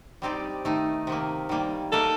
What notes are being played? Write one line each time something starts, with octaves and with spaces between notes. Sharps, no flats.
G3 C4 D#4 G4 D5
D#3 A3 D#4
C3 D#3 A#3
D#3 G3 A#3
A#3 D#4 A4 A#4 D#5